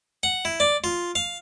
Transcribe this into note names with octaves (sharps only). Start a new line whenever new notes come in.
F#5
E4
D5
F4
F5